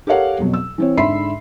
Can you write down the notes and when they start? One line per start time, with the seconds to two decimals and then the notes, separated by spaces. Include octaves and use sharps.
0.07 G4 A4 A#4 C#5 F5 F#5
0.39 F2 B2 F#3
0.54 E6
0.78 E3 C4 C#5
0.97 G#2 D3 E5 B5 C6 C7